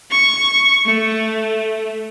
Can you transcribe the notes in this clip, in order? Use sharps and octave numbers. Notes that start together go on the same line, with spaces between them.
C#6
A3